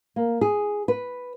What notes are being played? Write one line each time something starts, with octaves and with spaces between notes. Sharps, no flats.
A#3
G#4
B4